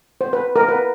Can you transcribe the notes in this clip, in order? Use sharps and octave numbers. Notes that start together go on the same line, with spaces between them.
C5
B4
A#4
B4